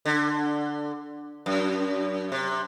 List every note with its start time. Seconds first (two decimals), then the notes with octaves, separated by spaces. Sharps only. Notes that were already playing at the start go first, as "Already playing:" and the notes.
0.06 D3
1.46 F#2
2.32 C3